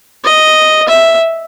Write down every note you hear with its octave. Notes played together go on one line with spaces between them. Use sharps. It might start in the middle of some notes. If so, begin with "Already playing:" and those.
D#5
E5